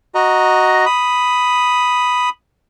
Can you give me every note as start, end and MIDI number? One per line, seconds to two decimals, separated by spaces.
0.15 0.85 66
0.15 0.85 75
0.15 0.85 82
0.86 2.29 83
0.86 2.29 87